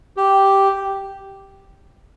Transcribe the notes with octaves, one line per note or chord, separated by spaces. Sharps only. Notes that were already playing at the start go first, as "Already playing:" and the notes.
G4